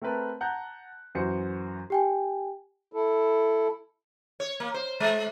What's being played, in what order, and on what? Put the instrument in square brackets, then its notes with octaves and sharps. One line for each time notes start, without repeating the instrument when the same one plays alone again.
[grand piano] A3 C4 A#4 B4 A5
F#5 A5 A#5 F#6 G6
F#2 E3 F#4 C5 C#7
[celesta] G4 G5 G#5
[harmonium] E4 A4
[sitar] C#5
A#3
C5
G#3